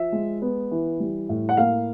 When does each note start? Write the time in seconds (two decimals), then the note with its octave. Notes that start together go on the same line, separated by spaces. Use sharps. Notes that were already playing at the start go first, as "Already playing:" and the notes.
Already playing: F3 E5
0.12 G#3
0.42 B3
0.71 E3
1.00 G3
1.29 A2
1.49 F#5
1.57 A#3 F5